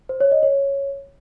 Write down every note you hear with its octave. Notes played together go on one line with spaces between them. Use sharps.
C5
C#5
D#5
C#5